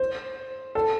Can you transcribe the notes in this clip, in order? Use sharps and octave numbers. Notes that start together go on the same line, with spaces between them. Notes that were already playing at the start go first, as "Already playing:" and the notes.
Already playing: C5
A4